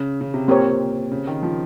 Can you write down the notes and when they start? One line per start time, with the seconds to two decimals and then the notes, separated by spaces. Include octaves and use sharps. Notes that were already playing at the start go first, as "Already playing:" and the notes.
Already playing: C#3
0.21 C#3
0.34 C3
0.47 A#2 C4 G4 A#4 C#5
1.12 C#3
1.27 D#3
1.43 F3